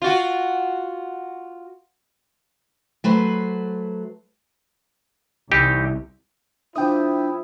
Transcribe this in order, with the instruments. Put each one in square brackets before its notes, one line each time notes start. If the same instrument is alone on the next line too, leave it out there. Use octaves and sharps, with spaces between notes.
[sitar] F4 F#4
[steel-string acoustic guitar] F#3 A3 B4 C5
[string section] C2 [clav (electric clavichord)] E3 D#4 G4
[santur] F3 E5 [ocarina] D4 [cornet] E4 [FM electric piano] G5 D#6